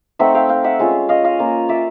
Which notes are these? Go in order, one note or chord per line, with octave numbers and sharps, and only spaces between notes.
A3 C4 D#4 E5 F#5
F5 G5
F5 G5
E5 F#5
G#3 C#4 F4
D#5 F5
D#5 F5
A#3 C#4 F4
D5 E5